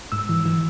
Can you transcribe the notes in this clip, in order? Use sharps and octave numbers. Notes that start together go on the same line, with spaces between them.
G#2 E6
E3
E3